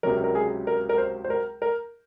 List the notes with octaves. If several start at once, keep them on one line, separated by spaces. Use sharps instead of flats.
C#2 C3 F#3 A#4
A#4
G#4
A#4
A#4
C5
C5
A#4
A#4